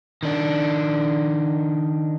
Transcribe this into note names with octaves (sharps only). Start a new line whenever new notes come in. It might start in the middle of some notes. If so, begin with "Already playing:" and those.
D#3 D4